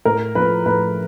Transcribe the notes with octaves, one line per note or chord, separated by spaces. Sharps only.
A2 A#4
F3 A3 B4
A2 B4